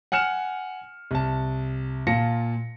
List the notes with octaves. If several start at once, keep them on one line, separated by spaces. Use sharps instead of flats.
F#5 G#5 F6 C#7 E7
C2 A5
A#2 F4 A5 A#6 C#7